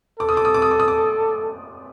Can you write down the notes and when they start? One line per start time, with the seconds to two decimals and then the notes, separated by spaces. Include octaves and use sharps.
0.19 A4 D6
0.29 D#6
0.37 D6
0.45 D#6
0.54 D6
0.62 D#6
0.71 D6
0.80 D#6
0.88 D6